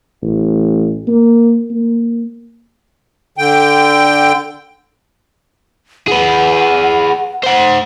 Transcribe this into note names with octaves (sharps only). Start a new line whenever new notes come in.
A1
A#3
A#3
D3 G5
G#4 B4 F#5
C5 F#5